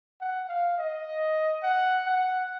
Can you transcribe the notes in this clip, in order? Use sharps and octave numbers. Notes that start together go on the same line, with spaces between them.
F#5
F5
D#5
F#5
F#5